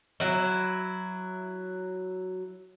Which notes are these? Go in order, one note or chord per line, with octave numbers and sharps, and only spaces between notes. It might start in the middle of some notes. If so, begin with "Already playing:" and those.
F#3 E4